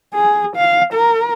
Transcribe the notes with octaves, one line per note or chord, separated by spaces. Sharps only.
G#4
F5
A#4